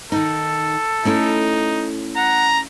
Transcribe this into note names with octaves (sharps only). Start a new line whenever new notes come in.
D#3 D#4 A4
A3 C#4 D#4 E4
F#5 A#5